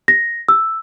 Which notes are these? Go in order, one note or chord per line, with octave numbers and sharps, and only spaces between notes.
A#6
E6